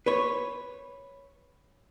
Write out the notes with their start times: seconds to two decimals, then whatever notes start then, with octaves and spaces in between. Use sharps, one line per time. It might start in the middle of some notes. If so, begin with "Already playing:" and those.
0.06 B4 C#5